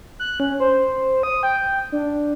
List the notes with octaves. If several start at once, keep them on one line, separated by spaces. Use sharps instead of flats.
F#6
C#4
C5
D#6
G5
D4